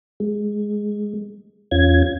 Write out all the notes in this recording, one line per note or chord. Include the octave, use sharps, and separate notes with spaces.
G#3
E2 C#4 F4 G#6